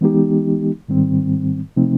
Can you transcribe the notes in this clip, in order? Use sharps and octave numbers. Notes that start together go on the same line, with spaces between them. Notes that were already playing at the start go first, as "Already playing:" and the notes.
E3 G#3 B3 D#4 G4
G#2 D#3 G3 C4
C3 F3 A3 C4 D#4